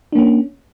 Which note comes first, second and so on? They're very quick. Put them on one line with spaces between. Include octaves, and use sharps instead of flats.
D4 A#3 C#4